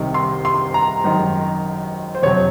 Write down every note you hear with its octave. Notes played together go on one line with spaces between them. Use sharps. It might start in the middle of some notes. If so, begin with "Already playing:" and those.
Already playing: C2 C3 D#3
C6
C6
A#5
G#1 F#2 D#3
C5
F2 C3 F#3 C#5